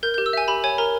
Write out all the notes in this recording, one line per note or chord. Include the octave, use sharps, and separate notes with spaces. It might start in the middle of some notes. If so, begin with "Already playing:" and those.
A#4 G6
G4 G6
E6
E5 G#5
G4 B5
C#5 G#5
A#4 A#5